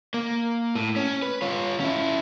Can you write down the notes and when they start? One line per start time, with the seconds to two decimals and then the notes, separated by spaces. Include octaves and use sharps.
0.14 A#3
0.75 A2
0.96 C#4
1.22 B4
1.42 F4 C#5
1.80 C#4 E4